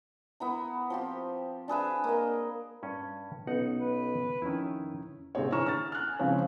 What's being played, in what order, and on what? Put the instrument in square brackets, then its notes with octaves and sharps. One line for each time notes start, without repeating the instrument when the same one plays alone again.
[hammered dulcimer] B3 E4 A#5
F3 C4 G4
D4 G#4 B4 E5
A#3 D#5
[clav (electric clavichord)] G2 C#4
[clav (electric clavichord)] B1 D#4 F#5 [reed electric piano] B3 C#4
[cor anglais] B4
[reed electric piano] F2 C#4 [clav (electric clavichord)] D#3 E4
[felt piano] G#1 C3 C4 G#4 C#5
D3 E3 A#5 C#6 F6 E7
F6 A6
F6 F#6
G#5
C#3 E3 F3 G#3 C4 C#4